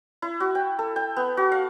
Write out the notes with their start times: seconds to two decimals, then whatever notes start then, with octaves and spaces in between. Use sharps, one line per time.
0.22 E4
0.40 F#4
0.55 G5
0.79 A4
0.96 G5
1.16 B3
1.37 F#4
1.52 F5